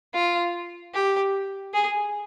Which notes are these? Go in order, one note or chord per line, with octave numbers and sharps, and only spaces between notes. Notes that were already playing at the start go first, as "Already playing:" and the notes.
F4
G4
G#4